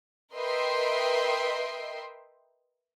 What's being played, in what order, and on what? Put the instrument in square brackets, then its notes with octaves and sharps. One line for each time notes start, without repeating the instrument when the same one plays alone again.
[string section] A#4 B4 D#5 E5 G5 C6